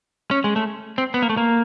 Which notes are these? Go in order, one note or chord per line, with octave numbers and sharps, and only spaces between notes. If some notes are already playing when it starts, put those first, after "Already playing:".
C#4
G#3
A3
C4
B3
A#3
A3
A#3